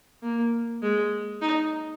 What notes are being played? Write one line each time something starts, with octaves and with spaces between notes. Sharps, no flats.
A#3
G#3
D#4